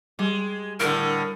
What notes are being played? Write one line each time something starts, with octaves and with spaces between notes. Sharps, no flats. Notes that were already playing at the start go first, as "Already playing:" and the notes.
G3 G#3
A2 D3 A#4